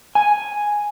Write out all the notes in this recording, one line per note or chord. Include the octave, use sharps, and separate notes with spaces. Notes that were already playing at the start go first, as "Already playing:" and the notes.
G#5